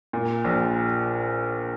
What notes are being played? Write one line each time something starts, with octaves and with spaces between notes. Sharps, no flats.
A#2
A#1